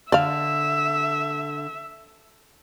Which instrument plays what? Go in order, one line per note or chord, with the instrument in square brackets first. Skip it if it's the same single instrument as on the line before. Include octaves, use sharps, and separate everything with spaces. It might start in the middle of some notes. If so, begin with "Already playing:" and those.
[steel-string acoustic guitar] D3 [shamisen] D5 F5 [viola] E5